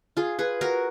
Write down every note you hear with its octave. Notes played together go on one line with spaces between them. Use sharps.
F4 G#4
G#4 B4
F#4 A#4